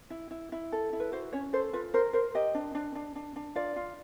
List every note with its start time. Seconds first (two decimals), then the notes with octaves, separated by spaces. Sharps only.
0.10 E4
0.31 E4
0.52 E4
0.72 A4
0.93 E4
1.00 B4
1.12 F#4 C5
1.33 C#4 C#5
1.53 A4 C5
1.73 F4 B4
1.94 A#4 C5
2.13 A#4 C5
2.35 G4 D#5
2.55 D4
2.75 D4
2.95 D4
3.15 D4
3.36 D4
3.55 F4 D5
3.76 F4